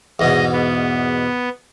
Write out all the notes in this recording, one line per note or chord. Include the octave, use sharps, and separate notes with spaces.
E2 G#2 B2 D#5
B3